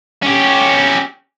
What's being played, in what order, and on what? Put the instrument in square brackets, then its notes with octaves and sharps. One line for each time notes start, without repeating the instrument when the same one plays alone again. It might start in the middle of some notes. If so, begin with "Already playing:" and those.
[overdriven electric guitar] C#4 G4